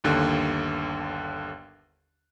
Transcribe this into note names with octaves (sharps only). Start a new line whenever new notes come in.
G1 D#2 D3